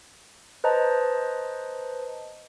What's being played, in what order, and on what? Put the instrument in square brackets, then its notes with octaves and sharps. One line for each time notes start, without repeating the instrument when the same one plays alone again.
[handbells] B4 C5 D#5 A5 A#5